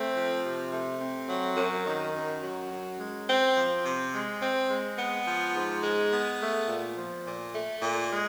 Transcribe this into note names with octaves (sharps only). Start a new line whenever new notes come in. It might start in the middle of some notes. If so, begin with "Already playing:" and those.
Already playing: A3 C4
F3
C3
A3
C4
F#3
F#2
D#3
F#2
F#3
F#2
G#3
C4
F3
C3
G#3
C4
G#3
B3
F3
G#2
G#3
B3
A3
A#2
F3
A#2
A3
A#2
G#3